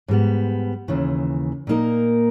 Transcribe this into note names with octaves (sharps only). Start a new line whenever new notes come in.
G#2 G3 B3
D#2 C#3 E3
A#2 A#3 D#4 A#4